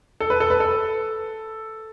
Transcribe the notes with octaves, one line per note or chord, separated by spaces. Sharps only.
A4
B4
A4
B4
A4